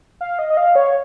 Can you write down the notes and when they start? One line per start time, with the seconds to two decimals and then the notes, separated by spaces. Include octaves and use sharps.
0.21 F5
0.39 D#5
0.50 D#5
0.57 F5
0.75 C#5